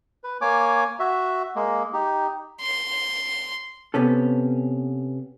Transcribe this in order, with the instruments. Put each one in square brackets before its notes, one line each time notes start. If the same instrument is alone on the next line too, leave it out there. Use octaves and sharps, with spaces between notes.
[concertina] B4
A#3 C#5 G#5 D6
F#4 E5
G#3 A#3
D#4 G4
[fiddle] C6
[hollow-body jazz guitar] C3 B3 C#4 A4